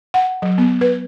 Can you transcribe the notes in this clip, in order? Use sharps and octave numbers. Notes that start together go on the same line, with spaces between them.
F#5
F#3
B3
B4